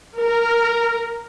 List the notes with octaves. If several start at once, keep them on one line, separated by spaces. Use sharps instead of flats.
A#4